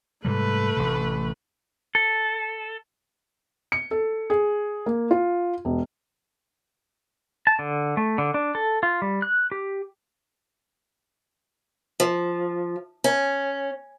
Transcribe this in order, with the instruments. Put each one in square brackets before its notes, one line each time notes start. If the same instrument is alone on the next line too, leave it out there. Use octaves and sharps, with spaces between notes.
[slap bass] G#2 C3 G3 [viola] A3 B4
[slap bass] A1 C3
[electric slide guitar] A4
[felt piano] C#7
A4
G#4
A#3
F4
E1
[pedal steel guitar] A5
D3
A3
D3
D4
A4
F4
G3
F#6
G4
[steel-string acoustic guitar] F3
C#4